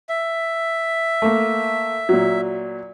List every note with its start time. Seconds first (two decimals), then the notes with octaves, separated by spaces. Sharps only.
0.09 E5
1.22 A3 A#3
2.09 A#2 F#3